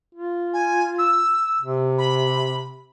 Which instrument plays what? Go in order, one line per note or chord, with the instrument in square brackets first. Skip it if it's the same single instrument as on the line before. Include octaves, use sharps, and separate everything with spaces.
[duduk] F4
[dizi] G#5
E6
[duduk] C3
[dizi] B5